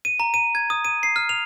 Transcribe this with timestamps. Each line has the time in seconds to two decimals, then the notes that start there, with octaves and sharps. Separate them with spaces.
0.05 D#7
0.20 A#5
0.34 D#7
0.55 G#6
0.70 D#6
0.85 D#7
1.03 C7
1.16 F6
1.29 F7